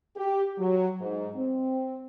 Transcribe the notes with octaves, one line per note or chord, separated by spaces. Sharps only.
G4
F#3
G#2
C4